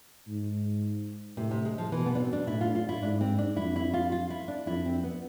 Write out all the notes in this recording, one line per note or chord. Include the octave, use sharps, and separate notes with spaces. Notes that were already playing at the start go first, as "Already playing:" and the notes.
G#2
A2 C3
C3
G#3
F3
B2 E3
B3
D4
C4
D4
A2 E4
F4
F4
E4
G#2 D4
C4
D4
F2 E4
E4
F4
F4
E4
D4
F2 E4
C4
B3